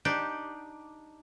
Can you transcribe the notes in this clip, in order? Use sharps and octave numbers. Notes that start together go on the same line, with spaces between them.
D4 D#4 G4